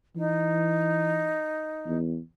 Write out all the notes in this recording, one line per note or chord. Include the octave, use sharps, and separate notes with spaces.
E3 D#4
E2